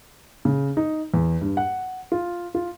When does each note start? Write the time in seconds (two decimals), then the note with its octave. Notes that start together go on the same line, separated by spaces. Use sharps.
0.45 C#3
0.77 D#4
1.14 E2
1.41 G2
1.57 F#5
2.12 F4
2.55 F4